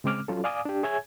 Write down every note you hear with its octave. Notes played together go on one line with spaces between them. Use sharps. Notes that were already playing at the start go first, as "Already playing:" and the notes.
C#3 G#3 C4 D6 F6
F#3 C#4 F4 F#4 A4
D5 F5 G#5 D6 D#6
D4 G4
G#4 C#5 E5 G#5 G#6